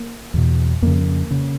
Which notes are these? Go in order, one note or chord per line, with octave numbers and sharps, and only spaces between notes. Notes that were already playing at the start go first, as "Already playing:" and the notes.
Already playing: A#3
E2 B2
F2 C#3 A#3
C#3